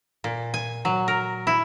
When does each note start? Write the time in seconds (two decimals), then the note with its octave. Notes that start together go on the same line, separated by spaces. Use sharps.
0.24 A#2
0.54 G#5
0.85 F#3
1.08 A#4
1.47 E4